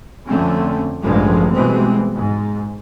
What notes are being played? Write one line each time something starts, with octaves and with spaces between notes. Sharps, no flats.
F2 D3 A3 C4 C#4
A1 G2 D3 F3 G3 G#3
B2 E3 G3 G#3 B3 C4
G#2